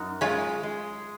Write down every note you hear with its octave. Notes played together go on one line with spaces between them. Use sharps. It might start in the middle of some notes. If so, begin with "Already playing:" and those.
Already playing: F#2 D#4 F#4
G#3 C#4 F4
G#3